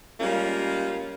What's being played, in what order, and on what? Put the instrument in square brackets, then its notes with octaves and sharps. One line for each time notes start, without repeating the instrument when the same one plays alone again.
[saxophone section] G3 G#3 A#3 C#4 F4